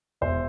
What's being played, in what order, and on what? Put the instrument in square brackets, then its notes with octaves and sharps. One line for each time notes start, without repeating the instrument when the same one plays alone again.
[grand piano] E1 C5 E5